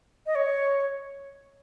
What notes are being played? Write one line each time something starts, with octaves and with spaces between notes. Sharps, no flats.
D#5
C#5